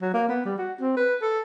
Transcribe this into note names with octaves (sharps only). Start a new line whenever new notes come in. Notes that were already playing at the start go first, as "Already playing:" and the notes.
F#3
A#3
B3
G3
F#4
C4
B4
A4